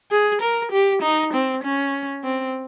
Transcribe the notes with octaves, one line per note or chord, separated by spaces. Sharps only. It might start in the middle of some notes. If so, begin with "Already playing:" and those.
G#4
A#4
G4
D#4
C4
C#4
C4